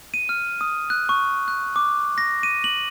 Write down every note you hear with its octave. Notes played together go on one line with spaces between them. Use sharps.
D#7
F6
D#6
F#6
C#6
F#6
D6
A#6
D#7
F#7